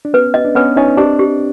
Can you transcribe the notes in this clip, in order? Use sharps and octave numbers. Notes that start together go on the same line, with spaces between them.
D4
B3 C#4 B4
D#5
D4
B3 C#4 B4
C#4 D#4 D#5
C4 D4 G4
G4